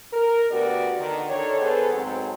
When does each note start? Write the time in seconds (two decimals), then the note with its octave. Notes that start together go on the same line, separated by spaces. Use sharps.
0.13 A#4
0.51 D2 B3 F#4 G4 D5
0.98 D3 D#3
1.29 D#3 D4 A4 C#5
1.60 B3 G#4 A4 B4 C5
1.93 G#2 F#3 C4